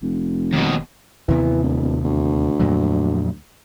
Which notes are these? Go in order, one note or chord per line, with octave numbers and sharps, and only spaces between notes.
F1
D#2 B2
D#2 C3 E3 B3
D1
D2
F2 A#2 F#3